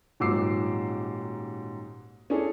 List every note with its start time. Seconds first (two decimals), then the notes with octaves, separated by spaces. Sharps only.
0.20 D#1 G#2 F#3 D6 E6 C7
2.30 C#4 D4 E4 G#4 A4